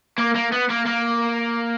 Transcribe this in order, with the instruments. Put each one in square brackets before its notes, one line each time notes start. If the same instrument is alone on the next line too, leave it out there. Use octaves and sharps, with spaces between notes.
[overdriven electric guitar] A#3
A#3
B3
A#3
A#3